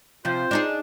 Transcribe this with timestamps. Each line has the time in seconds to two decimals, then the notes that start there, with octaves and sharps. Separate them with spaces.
0.25 C3 F3 C4 F4 C5
0.51 D4 D#4 G#4